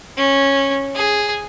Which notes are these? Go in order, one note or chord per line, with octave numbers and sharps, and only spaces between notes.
C#4
G#4